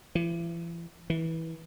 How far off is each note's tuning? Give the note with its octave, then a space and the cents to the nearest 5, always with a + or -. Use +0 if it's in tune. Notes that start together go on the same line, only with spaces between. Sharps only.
E3 +40
E3 -20